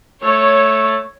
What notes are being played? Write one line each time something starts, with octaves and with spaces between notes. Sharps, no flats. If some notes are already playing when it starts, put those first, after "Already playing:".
A3 C#5